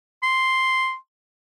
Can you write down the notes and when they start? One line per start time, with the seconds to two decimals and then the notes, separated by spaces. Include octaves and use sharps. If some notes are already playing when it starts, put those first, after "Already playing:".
0.23 C6